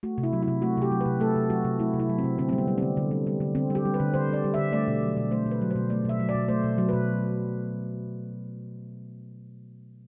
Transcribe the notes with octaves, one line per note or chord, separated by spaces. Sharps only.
A3 F#4
C3
E4
F#3
E4
C3
A3 F#4
C3 G4
F#3
C3 B4
A3 A4
C3
F#3 F#4
C3
A3 E4
C3
E4
F#3
C4
C3
D3 C4
G3 C4
B3
G3
D3 C4
D3
G3
G3
D3
D3 C4
G3 G4
G3
B4
D3
D3 C5
G3 D5
G3
D3 E5
A3 D5
B2
F#3
B2
A3 C5
B2
B4
F#3
B2 C5
A3 D5
B2 E5
F#3
D5
B2
A3 C5
B2
F#3
B2 B4